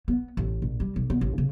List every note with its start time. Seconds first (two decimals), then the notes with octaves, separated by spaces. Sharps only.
0.08 B3
0.37 A1
0.62 A#1
0.80 G3
0.96 B1
1.10 B3
1.21 A1
1.38 C#3